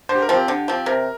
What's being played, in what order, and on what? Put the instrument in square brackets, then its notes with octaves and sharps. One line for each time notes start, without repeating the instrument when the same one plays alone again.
[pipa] D3 [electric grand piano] C5
[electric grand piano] G4
A#4
[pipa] F3 C4
[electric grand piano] G4
[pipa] D3
F3 C4
[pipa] C3 [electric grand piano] A#4